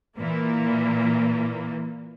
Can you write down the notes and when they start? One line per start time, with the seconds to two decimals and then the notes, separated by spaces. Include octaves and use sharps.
0.18 A#2 E3 A#3